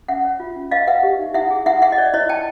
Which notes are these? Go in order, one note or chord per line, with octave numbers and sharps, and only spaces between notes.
C#4 E5 F#5
C#5
F4
C#4
B4 D#5 F5
B4 E5 F#5
G4
D#4
E4 E5 F#5
G#4
E4 E5 F#5
G#4 E5 F#5
D#5
C#5 D5
E4 C#5 D#5
E4 G5 A5